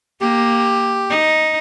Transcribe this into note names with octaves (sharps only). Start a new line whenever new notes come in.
A#3 G4
D#4